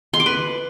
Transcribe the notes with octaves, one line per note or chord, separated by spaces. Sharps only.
C6
D6
B4